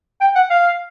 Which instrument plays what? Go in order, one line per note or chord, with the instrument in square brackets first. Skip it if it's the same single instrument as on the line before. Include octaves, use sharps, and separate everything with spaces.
[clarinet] G5
F#5
F5